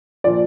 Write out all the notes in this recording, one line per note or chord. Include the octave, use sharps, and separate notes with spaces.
A#2 F3 D5